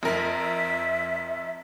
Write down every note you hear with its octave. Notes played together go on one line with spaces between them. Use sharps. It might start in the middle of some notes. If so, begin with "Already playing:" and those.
F2 A#4 E5